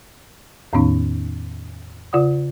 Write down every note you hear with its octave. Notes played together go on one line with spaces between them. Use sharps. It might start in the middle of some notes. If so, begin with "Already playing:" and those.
E2 A2 D#3 B3 C#4 D#4
C#3 F4 D5 F#5 D#6